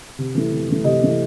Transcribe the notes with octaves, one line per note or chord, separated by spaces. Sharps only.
C3
E3 A3
C3
E3 A3
C3 D#5
E3 A3